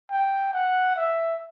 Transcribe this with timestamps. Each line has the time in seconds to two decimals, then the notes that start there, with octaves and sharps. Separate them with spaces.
0.11 G5
0.53 F#5
0.96 E5